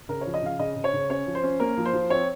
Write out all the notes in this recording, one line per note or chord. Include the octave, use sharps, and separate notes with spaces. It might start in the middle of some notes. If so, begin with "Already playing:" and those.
C#3 A#4
F3 C#5
D#5
C#3 F5
C#3 D#5
C#3
C#5
C#3
C#4 C#5
F3
C5
C#4
A#3 A#4
F3
C5
F3
C4 C#5